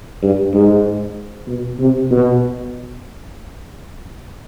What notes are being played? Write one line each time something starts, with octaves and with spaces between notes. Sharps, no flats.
G2
G#2
B2
C3
B2